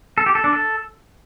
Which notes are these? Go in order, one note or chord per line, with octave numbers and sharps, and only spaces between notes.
A4
G4
A4
D4
A4